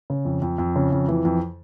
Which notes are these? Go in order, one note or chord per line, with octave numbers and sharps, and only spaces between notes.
C#3
F2
F2
F2
C#3
F2
E3
F2